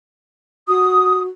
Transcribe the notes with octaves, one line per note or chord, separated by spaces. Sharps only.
F#4 D#6